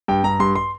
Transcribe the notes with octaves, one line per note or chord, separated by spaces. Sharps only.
G2 G5
G2 A#5
G2 C6
C6